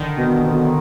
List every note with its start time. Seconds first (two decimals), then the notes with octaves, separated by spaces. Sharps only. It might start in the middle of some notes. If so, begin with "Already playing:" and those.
Already playing: D3 D#3
0.18 B2
0.45 B2